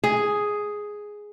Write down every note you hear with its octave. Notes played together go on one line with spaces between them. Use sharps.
G#4